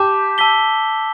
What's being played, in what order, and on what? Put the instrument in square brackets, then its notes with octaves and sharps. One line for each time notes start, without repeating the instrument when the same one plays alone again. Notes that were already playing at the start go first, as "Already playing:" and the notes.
Already playing: [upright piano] G4 [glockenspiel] A5 D6 G6 E7
[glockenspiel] A5 E6 B6 G7